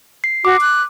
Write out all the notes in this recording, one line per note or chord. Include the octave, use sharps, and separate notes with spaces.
C7
F#4 D6
F#6